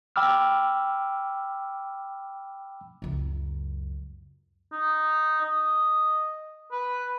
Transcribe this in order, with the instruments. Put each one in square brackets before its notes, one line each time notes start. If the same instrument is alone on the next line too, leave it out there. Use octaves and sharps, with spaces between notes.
[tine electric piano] G5 B5 D6 E6 F6
[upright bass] C#2 F#2
[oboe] D#4
D#5
B4